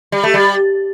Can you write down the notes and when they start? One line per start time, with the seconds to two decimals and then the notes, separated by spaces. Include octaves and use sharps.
0.12 G3
0.23 A3
0.34 G3